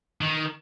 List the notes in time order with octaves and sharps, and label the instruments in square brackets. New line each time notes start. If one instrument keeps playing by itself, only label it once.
[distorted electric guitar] D#3